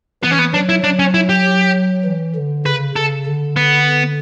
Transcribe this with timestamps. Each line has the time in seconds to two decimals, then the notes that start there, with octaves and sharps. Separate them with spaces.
0.23 E3 B3
0.31 C#4
0.39 B3
0.54 F#3 D4
0.69 E4
0.84 F#3 D4
0.99 C#4
1.14 E4
1.29 G4
2.05 E3
2.35 D3
2.66 C#3 B4
2.96 C#3 A4
3.26 D3
3.56 B3